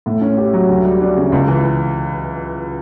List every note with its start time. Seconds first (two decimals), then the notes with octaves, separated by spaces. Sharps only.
0.06 A2
0.21 C#4
0.37 G4
0.53 F#3
0.69 D2
0.85 G3
1.01 D4
1.17 C#3
1.32 C#2
1.48 E3